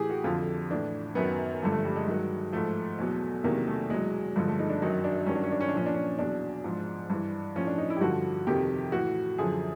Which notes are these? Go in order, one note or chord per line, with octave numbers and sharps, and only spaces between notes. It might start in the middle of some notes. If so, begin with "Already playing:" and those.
Already playing: A2 E3 G4 G#4
F#4
F2 D3 F3 F4
A2 E3 D4
F#2 D#3 F#3 B3
G2 D3 F3 A3
A3
G3
G#3
G2 D#3 F#3
G#2 F3 A3
E2 B2 F#3
E2 C3 D#3 F#3 A#3
A3
E2 B2 F#3 G#3
G2 D3 F3 G#3
A3
D#4
D4
F#2 D#3 F#3 D#4
D4
G2 D#3 F#3 C#4
D4
C#4
D4
C#4
D4
A#2 F3 C#4
D4
C#4
E2 B2 F#3 D4
G#2 F3
G2 E3
A2 F3 C#4
D4
D#4
E4
G4
G2 D3 F3 F#4
F2 C3 D#3 G4
A2 E3 F#4
F#2 D3 F3 G#4